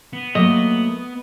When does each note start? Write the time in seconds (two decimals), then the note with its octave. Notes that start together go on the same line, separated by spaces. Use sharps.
0.13 B3
0.35 F#3 A3 A#3 D#5